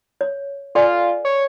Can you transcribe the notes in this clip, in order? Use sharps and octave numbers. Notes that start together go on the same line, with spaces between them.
C#5
F4 A4 D5 G#5
C#5